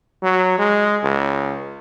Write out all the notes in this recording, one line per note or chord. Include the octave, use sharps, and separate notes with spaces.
F#3
G#3
C#2